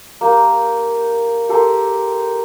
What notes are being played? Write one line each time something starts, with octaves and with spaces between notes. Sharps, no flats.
A#3 G4 A5
G4 A4 A#4 C6